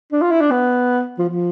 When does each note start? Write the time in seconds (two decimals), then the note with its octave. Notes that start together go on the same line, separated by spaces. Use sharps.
0.12 D4
0.21 F4
0.31 E4
0.41 D4
0.51 B3
1.18 F3
1.28 F3